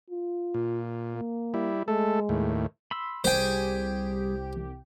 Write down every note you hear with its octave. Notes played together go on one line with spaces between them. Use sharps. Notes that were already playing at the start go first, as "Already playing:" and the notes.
F4
A#2
A#3
G3 E4
G#3 A3 A4
D#2 A2
B5 C6 E6
C2 G3 G4 G#4 C5 G5 G#5